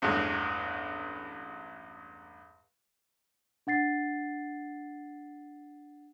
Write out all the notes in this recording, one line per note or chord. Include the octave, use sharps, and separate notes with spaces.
A1 E2 G2 G#3
D4 F#5 A6 C7